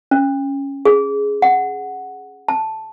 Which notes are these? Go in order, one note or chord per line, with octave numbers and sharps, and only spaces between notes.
C#4
G#4
F#5
A5